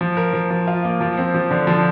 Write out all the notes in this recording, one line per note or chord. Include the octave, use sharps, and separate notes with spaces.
F3
A#4
F3
F3
F4
A#3
F3
C4
F3
D3
F3